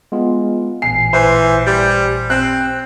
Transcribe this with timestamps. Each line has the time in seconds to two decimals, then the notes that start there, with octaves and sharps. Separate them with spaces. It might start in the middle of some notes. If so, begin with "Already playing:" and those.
0.12 G#3 B3 F4
0.82 A1 A#2 G#5 C7
1.13 E3 C5
1.67 G3
2.30 C4 F#6